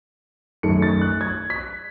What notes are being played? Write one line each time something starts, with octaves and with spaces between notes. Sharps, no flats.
F#2 D#3 A3 C#7
A6
F#6
G#6
B6